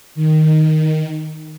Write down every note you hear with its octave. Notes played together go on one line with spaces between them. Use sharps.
D#3